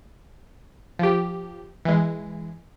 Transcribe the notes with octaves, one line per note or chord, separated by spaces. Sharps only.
F3 G4
E3 G#3